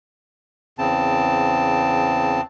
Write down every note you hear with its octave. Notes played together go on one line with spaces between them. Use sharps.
E2 C#3 C4 A5